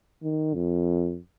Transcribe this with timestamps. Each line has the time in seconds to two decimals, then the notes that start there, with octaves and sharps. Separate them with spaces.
0.23 D#3
0.54 F2